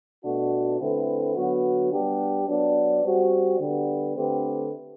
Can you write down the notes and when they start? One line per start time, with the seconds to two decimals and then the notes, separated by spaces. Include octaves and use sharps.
0.23 B2 A3 D4 F#4
0.80 D3 A3 C4 E4 B4
1.35 D3 F#3 B3 F#4
1.92 G3 B3 D4 G4
2.47 F#3 B3 D4
3.03 G3 C4 F#4
3.60 D3 G3 B3
4.16 D3 A3 C4 G4 B4